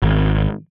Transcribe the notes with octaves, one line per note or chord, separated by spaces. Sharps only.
G#1